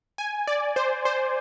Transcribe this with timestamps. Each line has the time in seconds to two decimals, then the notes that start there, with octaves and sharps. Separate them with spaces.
0.18 G#5
0.47 D5
0.76 C5
1.05 C5